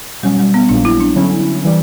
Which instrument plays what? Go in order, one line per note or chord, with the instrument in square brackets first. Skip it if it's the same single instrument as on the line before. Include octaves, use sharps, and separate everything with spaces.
[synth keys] B2 F#3 C#4 [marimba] G3
[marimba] G3
B3
[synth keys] A#1 A#2 F#3 A#3 [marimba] D4
[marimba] E4
D4
[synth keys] D3 F#3 C#4 E4
E3 G3